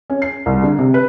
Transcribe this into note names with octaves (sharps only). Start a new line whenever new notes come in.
C#4
C7
C2
D3
C3
B4